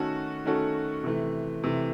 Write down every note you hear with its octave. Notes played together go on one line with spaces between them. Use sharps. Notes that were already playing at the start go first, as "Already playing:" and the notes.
Already playing: D#3 A3 C#4 F#4 A4
D#3 A3 C#4 F#4 A4
C3 E3 A3
C3 E3 A3